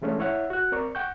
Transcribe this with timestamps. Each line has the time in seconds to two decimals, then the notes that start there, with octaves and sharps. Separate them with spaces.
0.02 E3 G#3 A3 C#4 D4
0.19 E4 C#5 E5 F#5
0.50 F#4 F#6
0.72 C4 A#4 D5 C#6
0.95 F#5 G5 C#6 G6